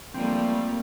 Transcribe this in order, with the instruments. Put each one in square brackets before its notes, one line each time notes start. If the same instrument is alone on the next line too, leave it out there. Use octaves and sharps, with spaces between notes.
[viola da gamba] F3 G3 A3 [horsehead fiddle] A#3 [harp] C4